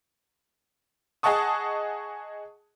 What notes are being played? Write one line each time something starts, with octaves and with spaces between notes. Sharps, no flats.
G#4 D#5 F#5 A5 C#6 D#6